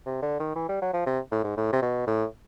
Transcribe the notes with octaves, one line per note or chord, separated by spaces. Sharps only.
C3
D3
D#3
E3
G3
F#3
F3
C3
A2
G#2
A2
C3
B2
A2